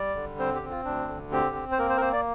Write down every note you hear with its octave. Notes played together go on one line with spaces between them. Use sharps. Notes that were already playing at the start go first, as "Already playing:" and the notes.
Already playing: G3 D5
D3
C4 C5
G4
C4
F4
D2 D4
D3
C4 G4
C4
C5
A#3 A#4
C5
A#4
A#3 C5
D5